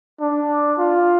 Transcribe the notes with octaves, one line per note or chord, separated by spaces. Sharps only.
D4
F4